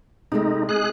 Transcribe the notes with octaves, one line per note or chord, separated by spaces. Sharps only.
C3 G#3 A3 D#4
G#3 G#4 F#6